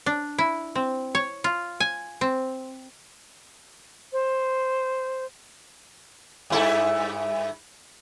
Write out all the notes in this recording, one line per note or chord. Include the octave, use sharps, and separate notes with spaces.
D4
E4
C4
C#5
F4
G#5
C4
C5
G2 E4 A4